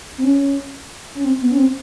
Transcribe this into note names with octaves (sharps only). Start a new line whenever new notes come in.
C4
C#4
C#4
C4
B3
C#4
C4